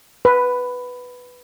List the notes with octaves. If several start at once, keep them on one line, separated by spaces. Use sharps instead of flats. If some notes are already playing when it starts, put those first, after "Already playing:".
B4